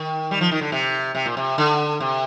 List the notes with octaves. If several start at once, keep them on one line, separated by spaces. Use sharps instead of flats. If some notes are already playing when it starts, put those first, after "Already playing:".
Already playing: D#3
G3
F3
D#3
D3
C3
C3
A#2
C3
D3
C3